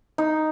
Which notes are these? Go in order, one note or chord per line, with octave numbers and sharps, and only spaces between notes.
D#4